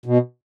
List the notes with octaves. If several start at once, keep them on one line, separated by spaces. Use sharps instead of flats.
B2